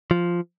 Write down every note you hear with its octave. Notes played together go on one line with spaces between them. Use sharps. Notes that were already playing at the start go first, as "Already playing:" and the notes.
F3